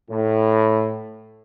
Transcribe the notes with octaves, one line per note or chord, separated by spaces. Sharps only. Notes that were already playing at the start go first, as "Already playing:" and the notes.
A2